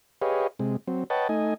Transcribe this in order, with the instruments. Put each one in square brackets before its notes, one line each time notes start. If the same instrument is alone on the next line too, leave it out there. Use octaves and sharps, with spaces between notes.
[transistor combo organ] G4 G#4 B4 C#5 D#5 F5
C3 G#3
F#3 C4
B4 C#5 D#5 F#5 G5 A5
A3 D#4 D#5 G#5